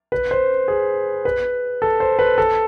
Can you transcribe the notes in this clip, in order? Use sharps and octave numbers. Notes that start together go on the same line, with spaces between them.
B4
C5
G#4
B4
A4
C5
B4
A4